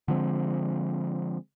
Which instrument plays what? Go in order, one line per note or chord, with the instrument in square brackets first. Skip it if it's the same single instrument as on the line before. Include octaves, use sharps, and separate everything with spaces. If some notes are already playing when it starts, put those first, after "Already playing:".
[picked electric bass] D3 F3 G#3 C4